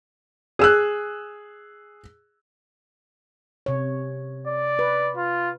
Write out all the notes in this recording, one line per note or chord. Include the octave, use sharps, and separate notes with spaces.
G#4 E6 F#6
C3 C#5
D5
B4
F4